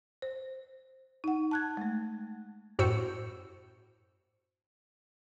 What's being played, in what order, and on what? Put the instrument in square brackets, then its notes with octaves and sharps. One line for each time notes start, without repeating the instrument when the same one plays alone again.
[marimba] C5
D#4 F#5
A5 F#6 G#6
G#3 A3
[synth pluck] F#2 A2 F#4 C5 E6 C#7